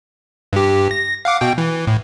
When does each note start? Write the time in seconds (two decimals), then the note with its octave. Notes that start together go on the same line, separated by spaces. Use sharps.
0.53 G2 G4
0.91 A#6
1.25 F5 F#5 D6
1.41 B2 G5
1.58 E3
1.87 A2